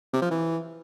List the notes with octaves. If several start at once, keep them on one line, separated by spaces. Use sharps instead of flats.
C3
F3
E3